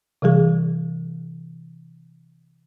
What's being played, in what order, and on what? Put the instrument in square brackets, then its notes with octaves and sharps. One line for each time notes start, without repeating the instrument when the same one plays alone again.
[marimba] C3 E3 G3 G#4